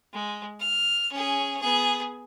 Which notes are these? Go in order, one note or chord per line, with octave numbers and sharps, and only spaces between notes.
G#3
F6
C#4 G#4
B3 G#4